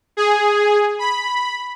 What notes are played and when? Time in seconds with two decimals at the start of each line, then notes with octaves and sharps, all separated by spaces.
0.17 G#4
0.99 B5